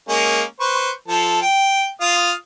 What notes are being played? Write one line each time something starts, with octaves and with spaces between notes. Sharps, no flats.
G#3 A#3 C#4
B4 C5 C#6
F3 A4
G5
F4 F5 D#6